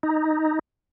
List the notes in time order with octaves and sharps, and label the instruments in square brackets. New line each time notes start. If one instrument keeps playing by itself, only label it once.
[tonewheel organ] D#4